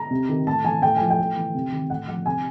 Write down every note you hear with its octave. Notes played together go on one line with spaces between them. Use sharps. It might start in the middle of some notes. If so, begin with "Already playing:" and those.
Already playing: A#5
C3
D#3
A2 A5
E3 G#5
A2 G5
F3 G#5
G5
A2
E3
C3
D#3
A2 F#5
F3 F#5
C3 G#5